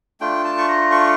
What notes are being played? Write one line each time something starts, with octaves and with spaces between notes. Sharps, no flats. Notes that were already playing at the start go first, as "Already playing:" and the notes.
A3 D4 F4 G5
A5
C#6
A#5
C#6